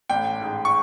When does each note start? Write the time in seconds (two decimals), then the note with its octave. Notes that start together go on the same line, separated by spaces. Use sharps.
0.10 A1 G5
0.42 G#2
0.65 C#6